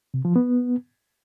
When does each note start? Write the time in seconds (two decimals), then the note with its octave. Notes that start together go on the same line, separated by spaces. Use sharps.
0.14 C3
0.25 F3
0.36 B3